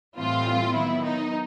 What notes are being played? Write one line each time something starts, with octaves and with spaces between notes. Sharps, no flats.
A2 E3 G3 C4 F4
D#3 F#3 B3 E4
D#4